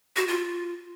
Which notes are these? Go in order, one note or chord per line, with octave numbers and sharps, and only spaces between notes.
F#4
F4